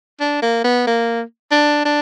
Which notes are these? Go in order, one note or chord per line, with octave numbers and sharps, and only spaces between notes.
D4
A#3
B3
A#3
D4
D4